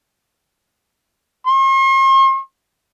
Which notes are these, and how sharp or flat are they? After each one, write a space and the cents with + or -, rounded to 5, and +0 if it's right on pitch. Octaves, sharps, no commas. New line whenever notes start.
C6 +45